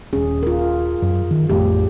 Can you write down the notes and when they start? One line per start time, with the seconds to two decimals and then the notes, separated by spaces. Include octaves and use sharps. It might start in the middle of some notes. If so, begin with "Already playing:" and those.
0.13 D#1 C#4 G#4
0.43 F4 A#4
1.02 F#2
1.31 D#3
1.50 A1 F2 A3 G4